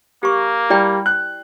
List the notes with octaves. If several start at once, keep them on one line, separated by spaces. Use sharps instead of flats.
A#3 G4 C#6
G3 E4 D5 G5
F#6